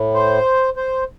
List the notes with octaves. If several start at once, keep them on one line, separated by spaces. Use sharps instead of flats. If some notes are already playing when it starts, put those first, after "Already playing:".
Already playing: A2
C5
C5